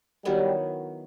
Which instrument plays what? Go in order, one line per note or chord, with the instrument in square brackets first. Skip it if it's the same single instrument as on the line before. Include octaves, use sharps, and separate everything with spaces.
[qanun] D#3 F#3 B3 E4 [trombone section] G3